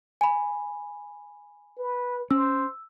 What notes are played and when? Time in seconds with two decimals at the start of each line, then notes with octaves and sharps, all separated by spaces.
0.21 G#5 B5
1.78 B4
2.31 C#4 C5 E6